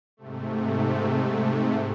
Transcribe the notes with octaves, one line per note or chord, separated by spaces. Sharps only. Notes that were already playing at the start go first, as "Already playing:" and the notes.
G#2 C3 A3